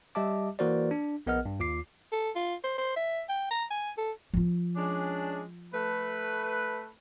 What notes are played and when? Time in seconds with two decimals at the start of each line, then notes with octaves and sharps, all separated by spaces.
0.15 G3 G4 D#5 E5 A5 D6
0.59 E3 A#3 F#4 A#4 C5 D5
0.91 D4
1.27 A#1 B3 A#4 D#5 F#5 F6
1.45 G2
1.59 D#2 F4 D6 C7
2.12 A4
2.35 F4
2.64 C5
2.78 C5
2.96 E5
3.29 G5
3.51 A#5
3.71 G#5
3.98 A4
4.33 F3 F4
4.76 G#3 C#4 D4
5.73 A3 B4